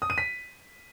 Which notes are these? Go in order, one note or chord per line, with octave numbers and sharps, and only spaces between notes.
D#6
D#7
B6